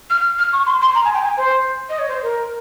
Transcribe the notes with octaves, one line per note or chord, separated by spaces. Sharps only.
F6
F6
C#6
C6
C6
A#5
G#5
G5
G#5
C5
D#5
C#5
C5
A#4